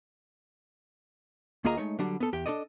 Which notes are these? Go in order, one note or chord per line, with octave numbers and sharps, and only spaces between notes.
D2 A#3 F4 G#4 D#5 A#5
G#3 A3 D#4 C#5
D3 F#3 G3 D4
B3 A4
E2 G4 G5
D4 G4 A4 D5 D#5